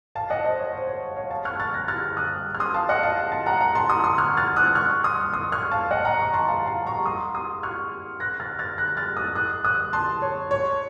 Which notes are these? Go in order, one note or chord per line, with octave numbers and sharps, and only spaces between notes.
F5 A5
D#5 F#5
C5 D#5
C#5
C5
C#5
C#5 F5
F5 A5
C#6 F6
F6 A6
F#6 A#6
F6 A6
D#6 F#6
F6
C6 D#6
F5 A5
D#5 F#5
F5 A5
F5 A5
F#5 A#5
F#5 A#5
A5 C6
C6 D#6
C6 D#6
C#6 F6
F6 A6
D#6 F#6
C#6 F6
C6 D#6
C6 D#6
C#6 F6
F5 A5
D#5 F#5
F#5 A#5
A#5 C#6
A5 C6
F5 A5
F5 A5
A#5 C#6
C6 D#6
C6 D#6
C#6 F6
F#6 A#6
F6 A6
F6 A6
F#6 A#6
F6 A6
D#6 F#6
D#6 F#6
D#6 F#6
A5 C6
C#5
C#5